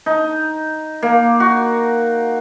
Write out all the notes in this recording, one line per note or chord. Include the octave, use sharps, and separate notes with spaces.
D#4
A#3
F#4